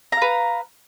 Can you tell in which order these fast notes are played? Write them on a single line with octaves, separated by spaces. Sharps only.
A#5 F5 B4